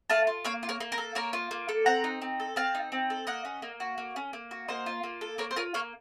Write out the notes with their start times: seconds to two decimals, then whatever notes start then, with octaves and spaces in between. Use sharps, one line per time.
0.10 A3 F5 A5
0.27 F4
0.45 A#3 C#5 F5
0.63 F4
0.69 A#4 C#5
0.80 A#3
0.92 A#4
0.98 A4
1.15 A#3 A#4 C#5
1.33 F4
1.51 A#3
1.69 A4
1.86 C4 F#5 A#5
2.04 D#4
2.22 C4
2.40 A4
2.56 C4 F5 A5
2.75 D#4
2.92 C4
3.10 A4
3.27 A#3 D#5 F#5
3.45 C#4
3.62 A#3
3.80 F#4
3.98 A#3
4.16 C#4
4.33 A#3
4.51 F#4
4.68 A#3 C5 D#5
4.86 F4
5.03 A#3
5.21 A4
5.38 A#3 A#4 C#5
5.51 C5
5.56 F4 A#4 C#5
5.74 A#3 C#5 F5